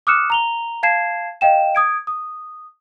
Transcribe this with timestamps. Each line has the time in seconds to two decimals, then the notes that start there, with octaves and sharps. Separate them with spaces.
0.07 D6 D#6 F6 F#6 C#7 E7
0.30 A#5 F7 G7
0.83 F5 A5 G#6 C7 E7
1.41 D#5 F5 G5 E7
1.75 D#6 G#6 D7
2.07 D#6